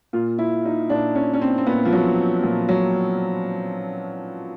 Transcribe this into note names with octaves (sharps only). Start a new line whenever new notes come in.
A#2 F4
E4
D#4
A#2 D4
C#4
C#4
C4
C4
A#2 B3
F3
F#3
A#2 F3
F#3